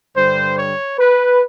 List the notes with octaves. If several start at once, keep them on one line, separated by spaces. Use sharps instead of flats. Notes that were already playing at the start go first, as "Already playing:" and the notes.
G2 D3 G3 C5
C#5
B4